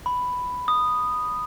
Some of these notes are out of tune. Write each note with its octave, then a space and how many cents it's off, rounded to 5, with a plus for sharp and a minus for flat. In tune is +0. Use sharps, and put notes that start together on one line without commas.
B5 +5
D#6 -10